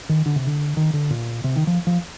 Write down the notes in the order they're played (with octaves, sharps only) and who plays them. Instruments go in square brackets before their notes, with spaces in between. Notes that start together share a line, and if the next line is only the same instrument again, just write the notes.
[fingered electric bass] D#3
D3
C3
D3
D#3
D3
A#2
C3
D#3
F3
F3